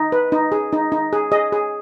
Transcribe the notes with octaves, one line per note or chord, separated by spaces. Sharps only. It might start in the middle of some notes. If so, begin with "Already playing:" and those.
Already playing: D#4
B4
D#4
G#4
D#4
D#4
G#4
G#4 D#5
G#4